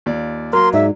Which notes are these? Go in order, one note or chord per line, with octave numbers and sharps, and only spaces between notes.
D#2 F4 D5
F#3 A#3 A#4 C6
G#2 D5 E5